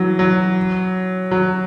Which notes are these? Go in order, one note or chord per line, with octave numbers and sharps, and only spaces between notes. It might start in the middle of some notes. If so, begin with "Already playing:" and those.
Already playing: E3 F#3
F#3
F#3